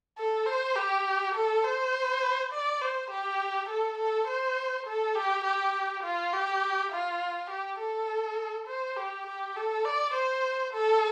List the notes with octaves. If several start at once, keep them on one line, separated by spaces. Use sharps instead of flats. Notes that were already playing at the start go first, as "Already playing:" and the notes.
A4
C5
G4
A4
C5
D5
C5
G4
A4
A4
C5
A4
G4
G4
F4
G4
F4
G4
A4
C5
G4
G4
A4
D5
C5
A4